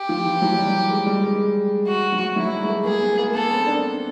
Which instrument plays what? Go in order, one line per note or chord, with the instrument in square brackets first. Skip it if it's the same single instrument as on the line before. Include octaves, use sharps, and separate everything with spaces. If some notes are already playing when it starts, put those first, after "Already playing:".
Already playing: [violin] G4
[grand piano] F3
E3
F#3
G3
G#3
G3
G#3
[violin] F#4
[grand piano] F#3
[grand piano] F#3 [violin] E4
[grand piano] G3
G#3
A3
[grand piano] A#3 [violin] G#4
[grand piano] B3
A#3
[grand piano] B3 [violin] A4
[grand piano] C4
D4